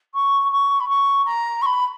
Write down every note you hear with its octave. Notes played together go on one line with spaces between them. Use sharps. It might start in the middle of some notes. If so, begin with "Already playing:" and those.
C#6
C#6
B5
C#6
A#5
C#6
B5